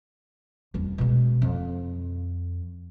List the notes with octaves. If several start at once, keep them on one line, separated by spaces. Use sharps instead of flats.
D#1 F2
B2 G#3
F2